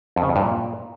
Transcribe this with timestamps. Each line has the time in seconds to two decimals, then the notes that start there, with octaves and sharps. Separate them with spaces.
0.16 F2
0.23 C#3
0.29 F2
0.36 G2
0.42 A#2